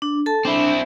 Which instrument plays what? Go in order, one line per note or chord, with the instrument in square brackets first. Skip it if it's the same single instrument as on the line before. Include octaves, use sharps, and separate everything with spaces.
[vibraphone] D4
A4 A5
[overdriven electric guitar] C4 E4 [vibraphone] D4